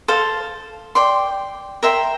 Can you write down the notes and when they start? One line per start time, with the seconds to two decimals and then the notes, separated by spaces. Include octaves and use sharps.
0.08 A4 C5 F5
0.95 D5 G5 C6
1.83 A#4 E5 G5 C6